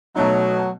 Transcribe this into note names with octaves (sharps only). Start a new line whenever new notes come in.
B2 F#3 A3 D#4